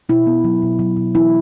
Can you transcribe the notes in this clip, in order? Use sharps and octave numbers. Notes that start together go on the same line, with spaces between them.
B2 E4
B3
F#3
B2
F#3
B2
E3 E4